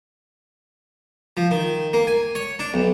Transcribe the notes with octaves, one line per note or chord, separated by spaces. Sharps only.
F3
D#3
A#3
G#5
C#5
D4
B1